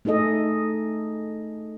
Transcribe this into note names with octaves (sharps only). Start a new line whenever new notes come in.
A3 D#4 G#4 A4 D#5